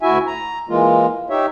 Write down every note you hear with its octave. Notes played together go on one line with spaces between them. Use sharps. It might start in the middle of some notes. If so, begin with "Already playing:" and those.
D2 E4 F#4 E5 G#5
A#5
E3 G#3 A#3 F4
D#4 G4 C#5 E5